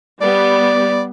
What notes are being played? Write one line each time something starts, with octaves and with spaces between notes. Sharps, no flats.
G3 B3 D5